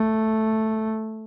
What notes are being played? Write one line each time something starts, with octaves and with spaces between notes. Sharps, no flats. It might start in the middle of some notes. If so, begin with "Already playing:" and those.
Already playing: A3